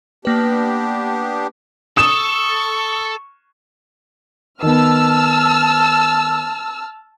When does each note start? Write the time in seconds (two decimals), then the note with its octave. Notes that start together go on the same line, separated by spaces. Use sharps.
0.25 A#3 B3 D4 G4 B4
1.97 A4 C#6 D#6 E7
4.62 D#3 B3 A5 E6 F6